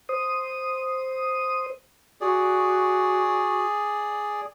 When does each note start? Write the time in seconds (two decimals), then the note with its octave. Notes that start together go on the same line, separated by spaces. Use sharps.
0.09 C5 D#6
2.21 F#4 G#4 D5